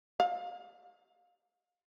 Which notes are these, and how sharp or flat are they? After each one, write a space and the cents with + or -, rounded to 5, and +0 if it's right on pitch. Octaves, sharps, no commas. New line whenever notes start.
F5 +25